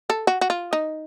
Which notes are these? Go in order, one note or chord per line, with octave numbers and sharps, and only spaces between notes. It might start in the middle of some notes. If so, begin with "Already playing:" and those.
A4
F#4
F#4
F4
D#4